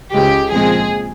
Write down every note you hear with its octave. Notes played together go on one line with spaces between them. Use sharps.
C#2 C#3 G#3 G4
A#2 F3 G#3 C4 G#4